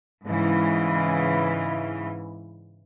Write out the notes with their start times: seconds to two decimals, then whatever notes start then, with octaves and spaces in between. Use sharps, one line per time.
0.25 G#2 C#3 E3